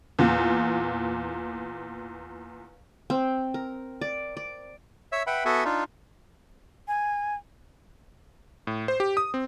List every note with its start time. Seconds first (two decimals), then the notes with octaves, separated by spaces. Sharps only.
0.19 E2 A#2
3.10 C4
3.54 A#4
4.01 D5
4.37 D5
5.12 C#5 E5 E6
5.27 B4 E5 F#5 G5 B5
5.45 B3 F#4 A4 E5 F#5 G#5
5.65 D4 D#4 F4
6.88 G#5
8.67 A2
8.88 C5
9.00 G4
9.17 D#6
9.34 C4